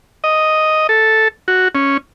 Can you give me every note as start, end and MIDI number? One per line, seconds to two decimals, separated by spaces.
0.24 0.87 75
0.89 1.28 69
1.48 1.68 66
1.75 1.97 61